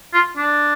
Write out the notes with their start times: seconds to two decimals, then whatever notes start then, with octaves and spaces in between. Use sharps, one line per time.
0.13 F4
0.37 D4